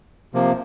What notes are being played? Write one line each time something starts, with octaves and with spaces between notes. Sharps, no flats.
C3 F3 A#3